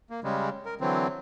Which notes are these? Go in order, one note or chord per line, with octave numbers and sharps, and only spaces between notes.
A#3
C#3 G3 G#3
A#4
D3 E3 F#3 C4